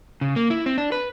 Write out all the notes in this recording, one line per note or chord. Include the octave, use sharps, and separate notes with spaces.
C#3
A#3
E4
C4
D4
B4